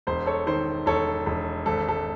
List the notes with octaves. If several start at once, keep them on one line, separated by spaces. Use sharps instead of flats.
E1 C5
A4 C#5
D#3 C5
E1 A4 C#5
E1
G#1 A4
A4